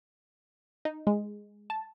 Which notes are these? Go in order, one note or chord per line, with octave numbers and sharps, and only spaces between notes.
D#4
G#3
A5